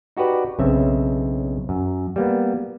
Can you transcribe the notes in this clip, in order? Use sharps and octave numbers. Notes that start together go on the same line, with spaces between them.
D#4 F#4 G4 B4 D5
B1 C#3 C4 E5
F#2
G3 A#3 B3